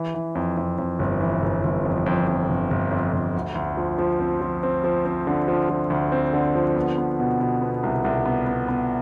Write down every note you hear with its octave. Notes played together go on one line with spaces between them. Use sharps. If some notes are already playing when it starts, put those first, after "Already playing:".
Already playing: E3
E3
F2
F2
F2
G1
E3
G1
G1
F2
F2
F2
G1
G1
F2
G1
D2
D2
F3
F3
C4
F3
C4
F3
C4
D3
F3
F3
D2
C4
D3
F3
B3
B3
B2
B2
B3
C2
C2
B3
B3
B3